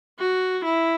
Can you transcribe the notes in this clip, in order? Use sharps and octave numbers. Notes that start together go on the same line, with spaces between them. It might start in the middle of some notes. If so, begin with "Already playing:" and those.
F#4
E4